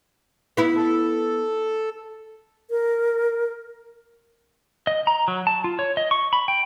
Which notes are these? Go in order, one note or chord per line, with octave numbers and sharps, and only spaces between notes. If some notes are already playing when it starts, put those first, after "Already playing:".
B3 E4
A4
A#4
D#5
A#5
F#3
A5
F4
C#5
D#5
C#6
B5
G5